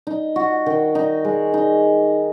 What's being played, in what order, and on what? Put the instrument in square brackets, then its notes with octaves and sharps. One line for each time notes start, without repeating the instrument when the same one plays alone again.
[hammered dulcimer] D#4
F#4
D#3
D#4
G#3
D#4